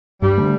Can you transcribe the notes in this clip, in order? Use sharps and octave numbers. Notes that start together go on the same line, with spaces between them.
G2 G3
D3 A3